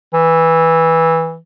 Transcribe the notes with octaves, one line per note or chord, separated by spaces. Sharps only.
E3